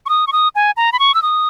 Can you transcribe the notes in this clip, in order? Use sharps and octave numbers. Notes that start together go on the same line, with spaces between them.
C#6
D#6
C#6
D#6
G#5
A#5
B5
C#6
E6
D#6